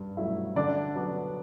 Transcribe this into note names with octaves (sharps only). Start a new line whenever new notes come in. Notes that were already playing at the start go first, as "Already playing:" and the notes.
Already playing: G2
F#3 A3 E4
D3 D4 D5
F#3 B3 D4